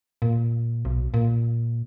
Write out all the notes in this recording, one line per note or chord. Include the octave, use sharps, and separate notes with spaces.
A#2
B1
A#2